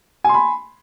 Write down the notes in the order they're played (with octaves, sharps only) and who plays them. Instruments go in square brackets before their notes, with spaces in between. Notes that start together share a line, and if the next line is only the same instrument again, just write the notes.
[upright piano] G#5
C6
B5